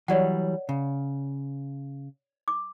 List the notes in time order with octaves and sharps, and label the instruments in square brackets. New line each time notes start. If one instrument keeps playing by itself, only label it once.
[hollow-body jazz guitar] E3 F#3 G3 [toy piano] C#5 D5 F#5
[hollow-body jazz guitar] C#3
[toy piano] D6